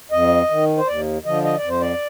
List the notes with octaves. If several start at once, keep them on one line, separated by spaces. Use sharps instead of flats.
F2 D#5
D#3
C5
D#2 D5
D3 F3 D#5
D#5
D5
F2
C5
D5